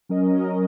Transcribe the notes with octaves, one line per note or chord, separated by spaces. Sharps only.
F#3 C#4 A#4 D#5